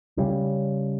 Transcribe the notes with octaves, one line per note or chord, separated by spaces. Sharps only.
C#3 G3 C#4